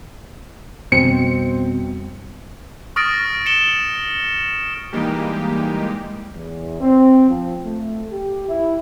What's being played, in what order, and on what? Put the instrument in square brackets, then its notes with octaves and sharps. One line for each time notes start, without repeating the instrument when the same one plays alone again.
[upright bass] F2 G3 [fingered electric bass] B2 [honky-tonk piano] C4 C#7
[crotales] C#6 D#6 F6 A6 A#6 D7
C#7 E7 G7
[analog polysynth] E3 G3 G#3 A#3 D#4 G4
[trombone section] E2
C4
F3
A3
G4
E4